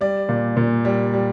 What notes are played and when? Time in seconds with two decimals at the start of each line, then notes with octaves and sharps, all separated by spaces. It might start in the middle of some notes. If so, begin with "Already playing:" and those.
0.01 G3 D5
0.29 A#2
0.57 A#2
0.85 G3
1.14 G3